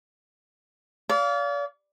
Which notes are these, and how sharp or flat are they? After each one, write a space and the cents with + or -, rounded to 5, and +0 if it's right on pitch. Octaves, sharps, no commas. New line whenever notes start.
D5 -40 F5 +0